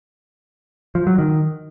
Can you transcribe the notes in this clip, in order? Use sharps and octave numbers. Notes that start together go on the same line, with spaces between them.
F3
F#3
D#3